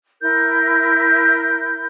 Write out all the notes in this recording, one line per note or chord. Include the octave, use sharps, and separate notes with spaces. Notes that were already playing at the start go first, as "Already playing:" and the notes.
E4 A#4 G6